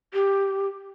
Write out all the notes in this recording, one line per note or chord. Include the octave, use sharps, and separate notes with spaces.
G4